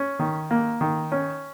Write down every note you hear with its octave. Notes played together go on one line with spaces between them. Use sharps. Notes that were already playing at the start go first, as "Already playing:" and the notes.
Already playing: C#4
D#3
A#3
D#3
C#4